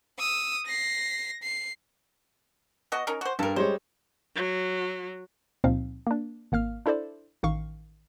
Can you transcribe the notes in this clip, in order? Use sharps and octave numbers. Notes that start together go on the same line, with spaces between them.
D#6 E6
A#6 C7
C7
B3 F#4 D#5
C#4 D#4 A#4
F#4 C5
G2 A4 A#4
G3 G#3 C5 C#5
F#3
C#2 A#2 F3 C4 D#4 F5
A#3 D4
G#1 A#3 F5 F6
D4 E4 A4 C5 D5
A1 D#3 F5 C#6